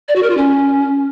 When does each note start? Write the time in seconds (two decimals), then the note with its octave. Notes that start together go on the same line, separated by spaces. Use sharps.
0.08 D5
0.16 F#4
0.23 A#4
0.30 F4
0.37 C#4